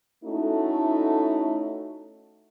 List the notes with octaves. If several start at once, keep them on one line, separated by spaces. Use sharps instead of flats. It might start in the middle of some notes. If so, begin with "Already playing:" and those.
A3 C#4 D#4 E4 F#4 A4